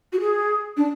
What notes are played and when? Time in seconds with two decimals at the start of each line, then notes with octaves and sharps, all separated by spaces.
0.13 F#4
0.20 G#4
0.77 D4